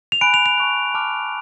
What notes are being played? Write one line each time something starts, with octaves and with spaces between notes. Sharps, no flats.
F7
G#5 B5 F#6 D7
F7
F7
A5 C#6 F#6
A5 D6 F6